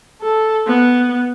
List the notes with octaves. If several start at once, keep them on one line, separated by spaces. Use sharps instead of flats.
A4
B3